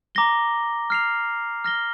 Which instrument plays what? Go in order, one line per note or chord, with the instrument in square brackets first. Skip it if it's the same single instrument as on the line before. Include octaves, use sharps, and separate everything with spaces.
[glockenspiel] A#5 D6 A#6 G7
F6 C7 F7
F6 A#6 G7